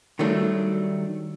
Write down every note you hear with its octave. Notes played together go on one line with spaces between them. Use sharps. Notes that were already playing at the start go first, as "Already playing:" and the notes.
D#3 F#3 G3 A3 D4